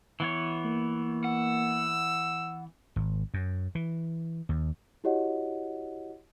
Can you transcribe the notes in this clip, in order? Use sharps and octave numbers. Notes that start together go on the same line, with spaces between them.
E3 B3 C#5
A#3
F#5 E6
G#1
F#2
E3
D#2
E4 F#4 G4 C#5 D#5 F#5